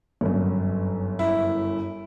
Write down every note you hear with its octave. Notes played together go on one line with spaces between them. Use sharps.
G1 F#2
E4